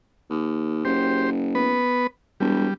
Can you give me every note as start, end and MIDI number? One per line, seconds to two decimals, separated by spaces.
0.30 0.82 39
0.85 1.80 30
0.85 1.30 67
0.85 1.30 72
1.55 2.07 59
1.55 2.07 71
2.40 2.67 28
2.40 2.74 55